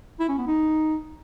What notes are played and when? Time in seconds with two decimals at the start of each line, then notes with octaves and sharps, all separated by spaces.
0.20 E4
0.29 C#4
0.38 B3
0.47 D#4